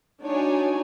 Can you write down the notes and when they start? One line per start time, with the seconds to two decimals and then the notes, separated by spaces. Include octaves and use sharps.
0.22 D4 D#4 F#4 C#5 D5 G#5